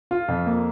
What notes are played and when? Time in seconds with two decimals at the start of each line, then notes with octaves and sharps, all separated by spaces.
0.11 F4
0.28 F2
0.46 A#3